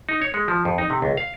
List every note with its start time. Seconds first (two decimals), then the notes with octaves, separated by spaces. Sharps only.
0.09 D#4
0.22 C#5
0.34 G#3
0.48 F3
0.65 F2
0.78 D#4
0.90 C3
1.02 C#2
1.17 F5